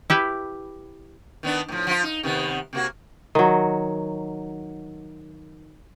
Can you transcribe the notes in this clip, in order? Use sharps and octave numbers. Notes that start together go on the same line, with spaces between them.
E4 G4 B4
D#3 B3 D4
A2 F3
F3 F4
D#4
C3 D#3 B3
C3 A#3 F#4
D#3 F#3